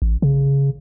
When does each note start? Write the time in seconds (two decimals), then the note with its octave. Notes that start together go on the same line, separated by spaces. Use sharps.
0.02 A1
0.22 C#3